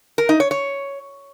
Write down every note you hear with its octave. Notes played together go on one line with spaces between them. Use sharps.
A#4
D#4
C#5
C#5